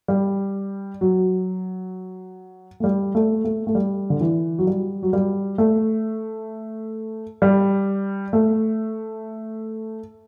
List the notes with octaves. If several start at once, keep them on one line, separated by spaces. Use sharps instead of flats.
G3
F#3
A3
G3
A3
A3
A3
G3
D3
E3
F#3
G3
F#3
G3
A3
G3
A3